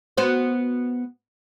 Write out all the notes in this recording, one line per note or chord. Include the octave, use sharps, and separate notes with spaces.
B3 F#4 C5